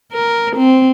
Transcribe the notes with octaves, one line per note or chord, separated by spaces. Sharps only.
A#4
C4